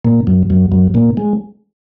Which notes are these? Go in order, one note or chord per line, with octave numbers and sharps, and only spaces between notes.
A#2 A#3
F#2 F#3
F#2 F#3
F#2 F#3
A#2 A#3
G#3